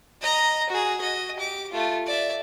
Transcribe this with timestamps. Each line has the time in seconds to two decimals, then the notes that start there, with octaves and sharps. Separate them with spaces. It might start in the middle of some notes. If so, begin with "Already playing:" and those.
0.22 D#5 A#5
0.70 F#4 G#4
1.01 F#4 D#5
1.35 G4 D6
1.72 A3 F4
2.07 D5 E5